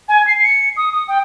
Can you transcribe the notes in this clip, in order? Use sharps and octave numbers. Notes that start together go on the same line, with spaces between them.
G#5
C7
C#7
D#6
D#6
G5